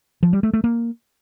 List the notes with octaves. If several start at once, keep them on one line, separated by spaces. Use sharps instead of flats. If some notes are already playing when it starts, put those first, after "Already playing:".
F3
G3
A3
A3
A#3